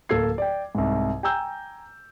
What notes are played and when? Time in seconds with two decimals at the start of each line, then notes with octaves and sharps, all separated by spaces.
0.09 D1 A#3 A4 F5 G#6 C7
0.38 D5 G5
0.75 C2 G#2
1.23 G5 G#5 A#5 E6 G6